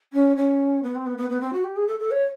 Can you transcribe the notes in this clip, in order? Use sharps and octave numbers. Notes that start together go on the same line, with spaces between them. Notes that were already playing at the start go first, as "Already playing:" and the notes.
C#4
C#4
B3
C4
B3
B3
B3
C4
F#4
G4
G#4
A4
A4
C#5